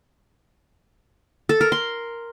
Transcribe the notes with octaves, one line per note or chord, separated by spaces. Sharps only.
A4
A#4
C6